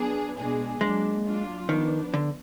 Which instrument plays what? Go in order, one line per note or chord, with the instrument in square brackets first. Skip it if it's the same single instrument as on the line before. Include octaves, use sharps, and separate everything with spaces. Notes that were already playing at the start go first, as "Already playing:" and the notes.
Already playing: [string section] F#3 B3 D4 G#4
B2 G#3 D4 G#4
[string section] F#3 A#3 D4 [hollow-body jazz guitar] G#3
[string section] F#3 D4 F4
[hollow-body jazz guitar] D#3 [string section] F3 B3 D4
[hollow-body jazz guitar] D3